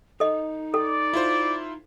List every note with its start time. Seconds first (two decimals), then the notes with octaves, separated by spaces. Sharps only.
0.20 D#4 A4 D#5
0.74 A4 D5
1.13 E4 F4 C5